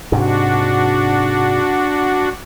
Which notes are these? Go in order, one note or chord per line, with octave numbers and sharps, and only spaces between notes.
G#2 C3 D4 F#4